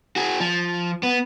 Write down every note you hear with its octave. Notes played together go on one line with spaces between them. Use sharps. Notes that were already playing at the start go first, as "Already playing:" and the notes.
F#4 G#4
F3
B3